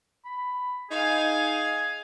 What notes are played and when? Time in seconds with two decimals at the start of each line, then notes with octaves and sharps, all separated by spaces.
0.25 B5
0.91 D#4 G#4 F5 G#5